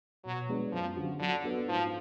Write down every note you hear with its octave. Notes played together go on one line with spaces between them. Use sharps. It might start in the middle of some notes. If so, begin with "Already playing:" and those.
B2 F#3
G#3 B3 D4 G#4
F#2 F3
D3 F#3 C#4 F#4
D3 F#3
B3 D4 F#4 A4
G#2 F3